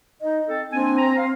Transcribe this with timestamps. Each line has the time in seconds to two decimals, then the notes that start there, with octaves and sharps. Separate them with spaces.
0.21 D#4 D#5
0.47 C4 A4
0.72 A#3 C4 D4 G#5
0.98 A#5
1.17 F5